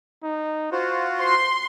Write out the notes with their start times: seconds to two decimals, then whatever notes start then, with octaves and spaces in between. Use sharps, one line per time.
0.23 D#4
0.72 F4 F#4 C5
1.19 C5 C6